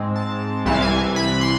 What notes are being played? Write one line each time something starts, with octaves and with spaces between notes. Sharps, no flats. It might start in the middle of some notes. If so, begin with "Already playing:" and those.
Already playing: G#2 G#3 C4
A5
C2 C3 E3 A5
F5
G#5
B5
C6